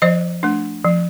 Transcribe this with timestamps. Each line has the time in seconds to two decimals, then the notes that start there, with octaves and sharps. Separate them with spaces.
0.02 F3 C5 D#5
0.43 A3 D4
0.85 F3